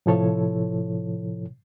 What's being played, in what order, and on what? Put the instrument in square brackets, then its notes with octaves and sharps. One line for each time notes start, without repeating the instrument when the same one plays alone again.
[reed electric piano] A2 C3 F3 E4 A4 C#5